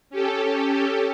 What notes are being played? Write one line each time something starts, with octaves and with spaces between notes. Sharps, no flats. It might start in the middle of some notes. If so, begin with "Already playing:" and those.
C#4 G4 A4